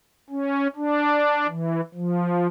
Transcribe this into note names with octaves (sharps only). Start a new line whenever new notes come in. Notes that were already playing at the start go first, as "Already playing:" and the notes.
C#4
D4
E3
F3